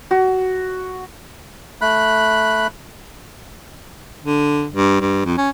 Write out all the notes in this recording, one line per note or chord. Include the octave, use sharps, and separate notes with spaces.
F#4
A3 B5 F#6
D3
G2
G2
F2
C#4